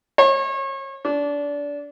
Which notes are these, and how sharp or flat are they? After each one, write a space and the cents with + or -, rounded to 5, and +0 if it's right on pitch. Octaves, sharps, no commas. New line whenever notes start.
C#5 -35
D4 -25